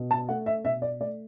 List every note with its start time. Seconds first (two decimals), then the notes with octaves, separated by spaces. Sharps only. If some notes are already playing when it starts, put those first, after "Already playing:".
Already playing: B2
0.11 A5
0.29 A3 F#5
0.46 E5
0.64 B2 E5
0.82 D5
1.00 A3 D5